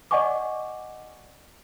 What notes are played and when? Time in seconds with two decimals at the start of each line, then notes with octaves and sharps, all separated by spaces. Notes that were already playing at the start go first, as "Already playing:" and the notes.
0.11 D5 D#5 F#5 G#5 C#6 D6